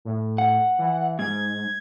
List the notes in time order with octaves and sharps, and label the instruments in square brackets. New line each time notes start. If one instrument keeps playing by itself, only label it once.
[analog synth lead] A2
[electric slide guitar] F#5
[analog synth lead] E3
[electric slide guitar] G#2 [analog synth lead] G#6